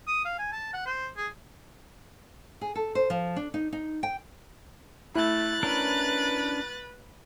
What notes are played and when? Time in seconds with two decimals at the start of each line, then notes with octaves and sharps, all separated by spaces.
0.07 D#6
0.25 F5
0.39 G#5
0.52 A5
0.73 F#5
0.86 C5
1.17 G#4
2.61 G#4
2.75 A4
2.95 C5
3.10 F3
3.36 D4
3.54 D#4
3.72 D#4
4.03 G5
5.15 A3 E4 F#6 A6
5.63 C#4 D4 A#4 B4